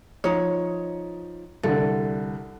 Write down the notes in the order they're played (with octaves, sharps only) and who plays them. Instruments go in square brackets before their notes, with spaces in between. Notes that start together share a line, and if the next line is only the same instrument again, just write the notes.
[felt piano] F3 [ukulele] D#4 C#5
[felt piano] C2 D3 [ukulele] A4